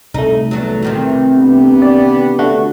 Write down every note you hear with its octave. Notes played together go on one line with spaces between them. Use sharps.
C2 A3 D#4
E2 F#3
C3 D#3 E3
B3 D4 G4
D5
D3 A3 F#4